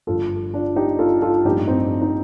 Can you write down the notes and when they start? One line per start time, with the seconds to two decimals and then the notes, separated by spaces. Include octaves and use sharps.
0.07 G1 G2 F3 F4 A4
0.54 D4 F4
0.76 D#4 G4
0.99 F4 A4
1.22 F4 A4
1.45 A1 G2 F3 D#4 G4
1.68 C4 D#4
2.02 D#4